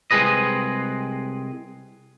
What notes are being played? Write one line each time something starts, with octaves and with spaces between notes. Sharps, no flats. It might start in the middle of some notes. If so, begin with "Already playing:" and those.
C2 G#3 C4 G#4 B4 D#5